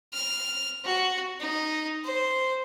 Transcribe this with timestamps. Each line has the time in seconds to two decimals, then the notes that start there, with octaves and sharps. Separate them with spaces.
0.14 F6
0.85 F#4
1.40 D#4
2.05 C5